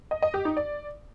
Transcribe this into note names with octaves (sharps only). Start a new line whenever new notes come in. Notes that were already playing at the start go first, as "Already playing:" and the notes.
D#5
D#5
G4
D#4
D5